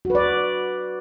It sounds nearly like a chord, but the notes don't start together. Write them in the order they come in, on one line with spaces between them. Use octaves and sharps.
F#4 B4 D5